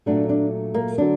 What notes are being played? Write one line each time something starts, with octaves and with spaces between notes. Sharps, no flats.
A#2 F#3 A3 D4
D4
A#3
D3 F#3 D4